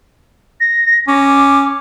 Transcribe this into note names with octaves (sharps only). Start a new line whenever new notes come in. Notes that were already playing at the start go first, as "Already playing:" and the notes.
A#6
C#4 D6